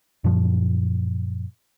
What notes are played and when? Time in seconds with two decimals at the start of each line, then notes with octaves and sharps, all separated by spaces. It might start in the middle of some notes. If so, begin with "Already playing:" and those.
0.24 F#2 A#2 F3